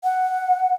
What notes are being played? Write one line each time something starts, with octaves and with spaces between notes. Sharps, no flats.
F#5